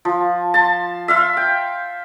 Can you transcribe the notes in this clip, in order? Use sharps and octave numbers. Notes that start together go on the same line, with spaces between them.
F3
A5 C6
E5 F5 C6
G5